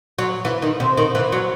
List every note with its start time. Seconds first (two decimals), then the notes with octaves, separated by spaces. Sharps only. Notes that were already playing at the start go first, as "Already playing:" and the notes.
0.19 F#3
0.45 E3
0.62 D#3
0.80 C3
0.97 D#3
1.15 E3
1.32 F#3